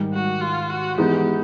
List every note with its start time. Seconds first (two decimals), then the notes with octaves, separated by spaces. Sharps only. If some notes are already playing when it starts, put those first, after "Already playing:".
Already playing: G#2 D#3 G3
0.13 F#4
0.41 F4
0.70 F#4
0.97 E3 G#3 B3 D#4 G4